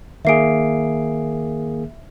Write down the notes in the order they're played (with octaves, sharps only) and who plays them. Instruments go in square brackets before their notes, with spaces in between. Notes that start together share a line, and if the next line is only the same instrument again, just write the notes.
[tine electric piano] D#3 A#3 G#4 [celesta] E5 C7 D7